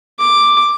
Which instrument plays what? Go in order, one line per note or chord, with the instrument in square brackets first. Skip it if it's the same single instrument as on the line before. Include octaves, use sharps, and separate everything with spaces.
[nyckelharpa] D6